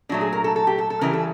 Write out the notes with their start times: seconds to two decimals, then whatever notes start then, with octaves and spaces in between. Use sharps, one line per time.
0.09 A#2 F#3 A3 D4
0.21 G#4
0.33 A#4
0.44 A4
0.56 A4
0.67 G4
0.78 A4
0.90 A4
1.01 C#3 E3 G3 A#4
1.13 A4